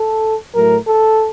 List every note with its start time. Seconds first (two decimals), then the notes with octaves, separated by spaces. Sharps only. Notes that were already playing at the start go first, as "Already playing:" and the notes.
Already playing: A4
0.54 A2 F#3 A3 A#4
0.87 A4